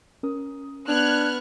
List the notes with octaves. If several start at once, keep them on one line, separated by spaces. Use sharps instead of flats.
C#4 A#4 D#6
B3 D4 F6 F#6 G#6